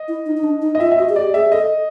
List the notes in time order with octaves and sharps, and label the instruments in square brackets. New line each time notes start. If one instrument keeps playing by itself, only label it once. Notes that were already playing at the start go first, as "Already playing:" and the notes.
Already playing: [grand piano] D#5
[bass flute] E4
D#4
D#4
D4
D#4
[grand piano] D#5
[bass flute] F4 [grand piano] E5
[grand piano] E5
[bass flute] F#4 [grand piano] D#5
[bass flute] G#4
[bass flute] G4 [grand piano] D5
[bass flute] G#4 [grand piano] E5
[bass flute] A4 [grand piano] D#5